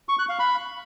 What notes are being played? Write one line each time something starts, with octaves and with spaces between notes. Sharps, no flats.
C#6
F#6
F5
B5